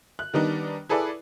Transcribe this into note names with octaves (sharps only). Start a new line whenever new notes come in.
F#6
D#3 G3 B3 D4 D#4
E4 G#4 A4 B4 D5